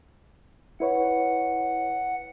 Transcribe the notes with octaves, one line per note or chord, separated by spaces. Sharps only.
E4 B4 C#5 F#5